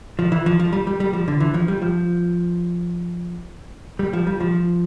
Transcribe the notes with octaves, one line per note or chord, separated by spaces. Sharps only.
F3
E3
F3
F3
G3
G3
G3
F3
D3
E3
F3
G3
F3
G3
F3
G3
F3